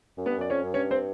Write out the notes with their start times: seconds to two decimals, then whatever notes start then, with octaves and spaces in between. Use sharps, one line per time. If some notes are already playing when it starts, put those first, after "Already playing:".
0.17 F#2
0.26 G2 B3 B4
0.38 F#2 D5
0.50 F2 C#4 C#5
0.63 F#2
0.74 G2 C#4 C#5
0.91 C4 C5